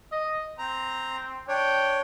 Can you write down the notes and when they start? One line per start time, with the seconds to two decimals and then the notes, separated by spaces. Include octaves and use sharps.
0.12 D#5
0.59 C4 A#5
1.48 D4 C#5 G5